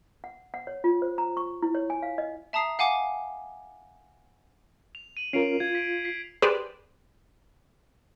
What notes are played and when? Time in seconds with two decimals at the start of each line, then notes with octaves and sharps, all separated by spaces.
0.24 F#5
0.54 F#5
0.67 C#5
0.84 F4
1.02 C5
1.18 A#5
1.37 C#6
1.62 E4
1.75 C#5
1.90 G#5
2.02 F5
2.18 D#5
2.53 E5 A5 A#5 D#6 C7
2.79 F5 F#5 G#5 D6
4.95 F7
5.17 D#7 F#7
5.33 C#4 F4 A#4 C7 D7 F7
5.60 F4 G#6
5.75 B6 D7
6.05 B6 C7
6.42 G4 G#4 B4 C5 D5